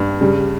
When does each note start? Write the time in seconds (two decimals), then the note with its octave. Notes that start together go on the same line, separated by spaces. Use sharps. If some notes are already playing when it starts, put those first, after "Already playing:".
Already playing: G2
0.21 C#3 G3